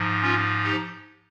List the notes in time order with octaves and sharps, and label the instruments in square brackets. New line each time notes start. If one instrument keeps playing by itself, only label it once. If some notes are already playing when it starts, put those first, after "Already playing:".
Already playing: [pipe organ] G#2 F3
C#4 F4
D#4 G4